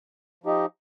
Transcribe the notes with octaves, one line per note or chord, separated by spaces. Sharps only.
F3 D#4 G4 D#5